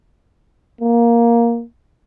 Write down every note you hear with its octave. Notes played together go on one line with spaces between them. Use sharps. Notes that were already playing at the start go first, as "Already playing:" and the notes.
A#3